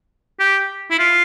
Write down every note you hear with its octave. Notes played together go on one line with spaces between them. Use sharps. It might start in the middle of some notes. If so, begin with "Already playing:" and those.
G4
E4
F4